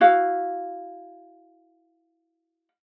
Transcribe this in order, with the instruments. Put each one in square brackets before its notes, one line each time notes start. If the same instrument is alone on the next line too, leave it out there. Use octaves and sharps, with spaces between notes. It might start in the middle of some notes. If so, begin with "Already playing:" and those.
[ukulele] E4 F#4 F5